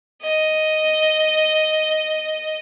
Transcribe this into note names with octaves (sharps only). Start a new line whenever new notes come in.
D#5